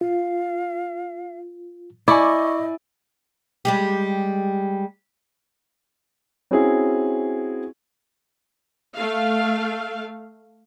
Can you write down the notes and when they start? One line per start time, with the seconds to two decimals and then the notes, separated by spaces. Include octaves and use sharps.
0.01 F4 F5
2.08 E4 D5 D#5 G#5 C#6 D6
3.65 G3 G#3 G4
6.51 C4 C#4 E4 F#4 G#4
8.94 A3 F5